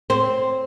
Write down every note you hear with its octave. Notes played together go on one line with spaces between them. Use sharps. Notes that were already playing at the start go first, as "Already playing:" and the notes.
C4